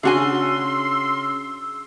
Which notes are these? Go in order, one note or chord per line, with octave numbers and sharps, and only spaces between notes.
C#3 D4 F#4 G#5 C6 E6